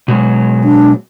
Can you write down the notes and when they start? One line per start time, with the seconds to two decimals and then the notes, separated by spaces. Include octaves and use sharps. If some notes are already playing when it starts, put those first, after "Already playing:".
0.08 B2 F#3 G#3
0.64 D4